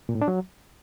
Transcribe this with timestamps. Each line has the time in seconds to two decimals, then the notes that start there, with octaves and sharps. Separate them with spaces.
0.09 A#2
0.15 A2
0.22 D4
0.28 F#3